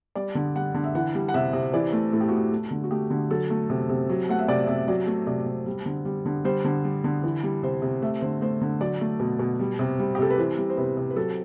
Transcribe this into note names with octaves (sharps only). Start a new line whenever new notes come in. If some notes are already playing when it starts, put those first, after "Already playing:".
G3 D5
D3
G3 F#5
D3
E5
E3 F#5
G3
F#5
C3 E5
C3
E3 D5
A3
A2 A4
G4
F#4
A2 G4
A3
D3
F#4
A3 G4
D3
F#3 A4
A3
C3
C3
F#3
A3 F#5
E5
C3 D5
C3 E5
F#3 D5
A3
C3 D5
C3
G3
D3
G3
D3
G3 C5
D3
G3
D3
E3
G3
C3 C5
C3
A3 E5
D3 C5
A3 C5
D3
F#3 D5
A3
B2
B2
G3
C3
G3
G4
C3 A4
B4
E3 C5
G3
C5
C3 B4
C3
B4
F#3 A4